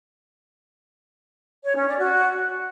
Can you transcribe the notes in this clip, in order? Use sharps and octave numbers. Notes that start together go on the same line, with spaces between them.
C#5
C#4
D5
F#4